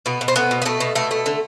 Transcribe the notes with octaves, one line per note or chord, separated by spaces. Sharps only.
B2 B3
B2
C4
A3 B3
B2
B3
B2 A3
B2
B2 A3
A3
D3